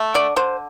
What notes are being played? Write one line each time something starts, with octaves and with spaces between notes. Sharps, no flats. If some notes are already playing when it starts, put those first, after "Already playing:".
Already playing: A3
D3 D5
D3 C5